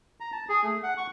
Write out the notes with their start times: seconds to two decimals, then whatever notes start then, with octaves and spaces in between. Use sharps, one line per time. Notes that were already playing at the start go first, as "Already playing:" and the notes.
0.20 A#5
0.32 A5
0.49 G#4
0.63 A3
0.83 F#5
0.98 C#6